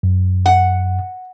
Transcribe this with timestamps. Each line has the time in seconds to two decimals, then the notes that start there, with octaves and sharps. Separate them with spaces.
0.03 F#2
0.46 F#5